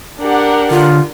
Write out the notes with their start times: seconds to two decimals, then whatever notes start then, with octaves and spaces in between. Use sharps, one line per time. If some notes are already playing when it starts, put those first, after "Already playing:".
0.20 D4 G4 A#4 F#5
0.70 D3 F4